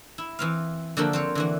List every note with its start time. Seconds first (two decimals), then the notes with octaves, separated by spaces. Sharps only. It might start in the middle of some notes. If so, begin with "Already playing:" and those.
0.18 E4
0.39 E3 C4 F5
0.97 D3 F3 A#3 F#4 A4
1.13 C4 C5 C#5
1.35 D3 E3 F#4